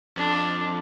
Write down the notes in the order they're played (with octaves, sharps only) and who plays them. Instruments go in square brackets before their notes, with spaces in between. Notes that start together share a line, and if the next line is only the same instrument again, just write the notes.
[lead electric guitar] F2 [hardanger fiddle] D4